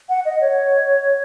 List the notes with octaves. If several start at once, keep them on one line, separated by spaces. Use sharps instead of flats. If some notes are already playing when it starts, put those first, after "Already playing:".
F#5
D#5
C#5